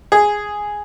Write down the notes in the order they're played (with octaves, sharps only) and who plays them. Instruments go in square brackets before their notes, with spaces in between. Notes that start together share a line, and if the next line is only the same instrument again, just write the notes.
[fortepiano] G#4